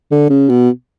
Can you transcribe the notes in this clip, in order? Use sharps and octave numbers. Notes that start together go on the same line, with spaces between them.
D3
C#3
B2